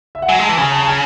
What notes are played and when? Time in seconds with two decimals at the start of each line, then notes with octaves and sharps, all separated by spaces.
0.15 E5
0.22 F#5
0.29 F#3 G#5
0.39 G#3 A5
0.49 E3
0.57 C#3 G#5
0.72 A5
0.82 A5
0.87 G#5